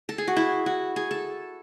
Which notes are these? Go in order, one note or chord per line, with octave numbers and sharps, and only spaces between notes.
A4
G#4
F#4
E4
F#4
G#4
A4